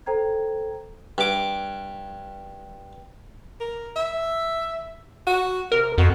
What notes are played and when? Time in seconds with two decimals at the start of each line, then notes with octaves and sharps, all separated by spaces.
0.06 A4 C5 G5 A#5 G#6
1.18 G2 D6
3.60 A#4
3.96 E5
5.27 F#4
5.72 C3 A#4
5.98 F2 F#4